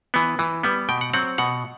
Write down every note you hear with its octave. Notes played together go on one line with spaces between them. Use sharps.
E3 B3
E3
G3 B3
B2 G5
F#5
F#3 C4 F#5
B2 F#5